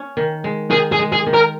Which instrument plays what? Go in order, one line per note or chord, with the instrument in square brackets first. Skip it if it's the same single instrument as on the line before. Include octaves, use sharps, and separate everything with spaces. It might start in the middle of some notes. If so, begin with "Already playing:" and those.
Already playing: [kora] C#4
D#3
G#3
[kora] D#3 [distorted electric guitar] G#4
[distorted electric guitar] G#4
[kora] G#3
[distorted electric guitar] G#4
[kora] D#3
[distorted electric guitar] A#4